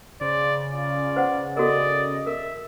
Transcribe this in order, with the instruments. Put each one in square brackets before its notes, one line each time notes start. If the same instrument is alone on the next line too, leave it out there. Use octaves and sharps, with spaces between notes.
[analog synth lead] C#3 [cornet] C5 [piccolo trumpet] D5
[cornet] F4 [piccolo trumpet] D5
[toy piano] B4 C5 F#5
[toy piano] F#4 A4 A#4 [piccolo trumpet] D5 [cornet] D#5
[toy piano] A#4 [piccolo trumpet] E5